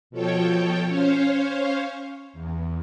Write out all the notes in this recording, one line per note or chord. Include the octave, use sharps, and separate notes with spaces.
B2 F3 A4 C#5 G5
C#4 C5 C#5 F5
E2